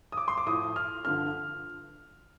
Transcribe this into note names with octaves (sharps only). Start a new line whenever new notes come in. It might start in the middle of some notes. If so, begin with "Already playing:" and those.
D#6
D6
C6
D6
A2 F3 D#6
F6
G2 D3 F3 F6